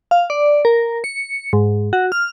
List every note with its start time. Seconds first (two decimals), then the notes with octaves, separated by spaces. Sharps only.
0.11 F5
0.30 D5
0.65 A#4
1.04 C#7
1.53 G#2
1.93 F#4
2.12 F6